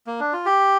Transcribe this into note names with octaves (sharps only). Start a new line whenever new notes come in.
A#3
D4
F4
G4